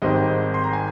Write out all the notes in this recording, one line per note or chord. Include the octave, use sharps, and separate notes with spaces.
G#1 G#2 G3 C4 D#5
C6
A#5
G#5